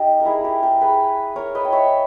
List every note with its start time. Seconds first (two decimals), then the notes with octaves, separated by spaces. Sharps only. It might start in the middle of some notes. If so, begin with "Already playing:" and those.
Already playing: D#4 G4
0.20 A#4
0.25 E4 G#4
0.44 G4 A#4
0.63 G4 A#4
0.81 G#4 B4
1.36 A#4 C#5
1.55 B4 D#5
1.65 G5
1.72 C#5 E5